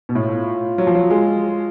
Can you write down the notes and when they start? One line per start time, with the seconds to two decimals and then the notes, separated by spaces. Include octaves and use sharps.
0.09 B2
0.15 A2 F4
0.78 F#3
0.87 F3
0.95 F#3
1.10 G#3